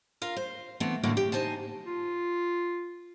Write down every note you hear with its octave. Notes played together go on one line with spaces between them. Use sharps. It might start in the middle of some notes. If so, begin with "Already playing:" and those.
F4 A#4 F5
C5
E3 A3 B3 C4
A2 D3 E3 A#3 F#4 F#5
G4
D#4 C5 G#5 A5
F4